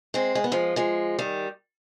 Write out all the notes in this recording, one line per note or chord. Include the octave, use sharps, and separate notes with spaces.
G#3 C4
G#3
B3
F3 G#3
F3 G#3
D#3 G3